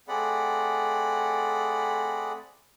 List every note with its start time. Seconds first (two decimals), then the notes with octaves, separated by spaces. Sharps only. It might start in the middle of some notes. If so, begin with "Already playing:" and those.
0.08 A3 C4 G#4 D5 F#5 B5